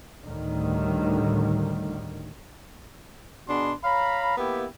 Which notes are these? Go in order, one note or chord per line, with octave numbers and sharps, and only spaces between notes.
D2 A2 D3 D#3 G3
B2 D4 F#4 G#4 B5 C6
C#5 F5 A#5 B5
A#3 B3 E4 G4